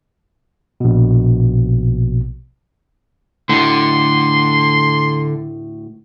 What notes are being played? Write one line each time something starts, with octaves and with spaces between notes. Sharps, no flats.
A#1 B2
D2 A2 D3 C6